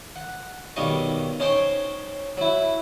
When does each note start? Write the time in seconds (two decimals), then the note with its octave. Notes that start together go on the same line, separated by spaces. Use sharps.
0.16 F#5
0.76 B1 D#3 G3 A#3 D#5 C#6
1.40 C#4 D#4 C5 C#5 G5
2.37 F#3 E4